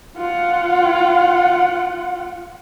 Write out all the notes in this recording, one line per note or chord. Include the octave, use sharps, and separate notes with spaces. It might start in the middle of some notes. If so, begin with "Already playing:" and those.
F4 F#5